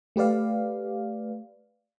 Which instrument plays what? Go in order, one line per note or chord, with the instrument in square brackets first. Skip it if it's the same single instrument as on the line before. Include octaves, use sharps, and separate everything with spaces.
[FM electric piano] A3 G4 B4 D5 F5